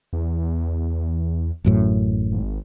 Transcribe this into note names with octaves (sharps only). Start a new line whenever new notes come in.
E2
A1 F#2 A2
G#1